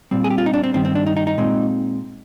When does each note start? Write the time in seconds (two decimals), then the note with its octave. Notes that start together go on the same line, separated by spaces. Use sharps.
0.11 A#2 G3 C4
0.24 G#4
0.30 G4
0.38 F4
0.46 D#4
0.54 D4
0.63 C4
0.74 G2 D#3 G3 C4
0.85 C4
0.95 D4
1.06 D#4
1.17 D#4
1.27 D#4
1.38 A#2 G#3 C4